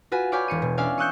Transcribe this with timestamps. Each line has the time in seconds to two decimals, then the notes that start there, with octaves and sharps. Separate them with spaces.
0.12 F4 F#4 B4 G#5
0.32 C#5 D5 F5 G5 G#5 B5
0.48 E1 C#7 D#7
0.62 B2
0.78 C#4 D4 D5 E5 F5 G#5
0.98 C#6 D#6 E6 F#6 G6 C#7